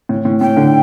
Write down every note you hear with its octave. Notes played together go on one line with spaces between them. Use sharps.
A2
A2
A2 G5
D3